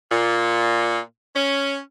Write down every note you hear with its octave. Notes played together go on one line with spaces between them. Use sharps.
A#2
C#4